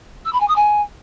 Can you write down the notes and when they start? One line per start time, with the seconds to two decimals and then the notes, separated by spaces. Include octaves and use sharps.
0.25 E6
0.33 B5
0.40 G#5
0.48 D#6
0.56 G#5